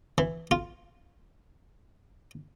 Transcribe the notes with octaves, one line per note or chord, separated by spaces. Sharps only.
E3
F4